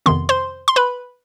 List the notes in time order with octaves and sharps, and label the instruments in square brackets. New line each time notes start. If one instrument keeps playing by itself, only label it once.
[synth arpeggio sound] F2 C3 D#3 B3 C6
C5 C6
C6
B4 B5